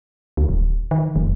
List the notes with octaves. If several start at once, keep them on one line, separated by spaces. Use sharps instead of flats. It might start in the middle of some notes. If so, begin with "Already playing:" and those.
D2
D1
D#3
F1